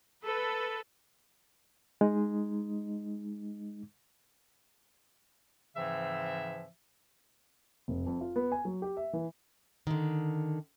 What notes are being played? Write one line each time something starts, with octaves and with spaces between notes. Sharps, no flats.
A4 B4
G#3 D#4
G#2 C#3 E3 F3 C4 E5
F1
F2
F4
B3
G#5
F#3
G4
E5
E3
D3 D#3